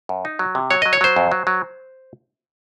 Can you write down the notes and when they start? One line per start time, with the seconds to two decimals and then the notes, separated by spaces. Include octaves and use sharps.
0.09 F#2
0.25 D#4
0.39 F#3
0.55 C3
0.71 F#3 C#5
0.82 F#3 D#5
0.93 C#5
1.01 F#3 C5
1.16 F2
1.31 F#3
1.47 F#3